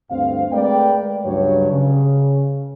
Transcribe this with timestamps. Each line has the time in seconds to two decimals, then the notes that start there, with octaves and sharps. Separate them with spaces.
0.11 D2 G2 C4 F5
0.52 G#3 A3 A#4 B4 D5 G5
1.25 C#2 G2 F#3 C#5
1.71 C#3